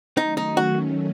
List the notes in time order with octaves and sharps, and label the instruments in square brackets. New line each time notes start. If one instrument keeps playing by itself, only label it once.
[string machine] D#3 F#3 A3 C#4 [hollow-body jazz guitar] D#4
[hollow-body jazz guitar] D#4
F#4